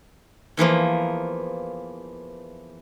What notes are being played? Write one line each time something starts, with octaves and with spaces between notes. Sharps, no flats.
E2 E3 F3 A#3